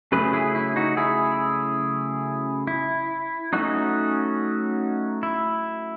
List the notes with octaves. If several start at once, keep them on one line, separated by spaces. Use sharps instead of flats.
C#3 F#3 A3 C#4 G#4 B4
E4 G#4
E4
D#4 F#4
E4 G#4
E4
F#3 A3 C#4 D#4 F#4
E4